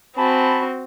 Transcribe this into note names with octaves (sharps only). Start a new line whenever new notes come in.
C4 F#4 G#5 A5 B5